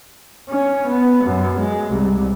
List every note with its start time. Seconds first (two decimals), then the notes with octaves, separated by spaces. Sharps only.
0.49 C#4
0.87 B3
1.24 F#2
1.58 G#3
1.90 C2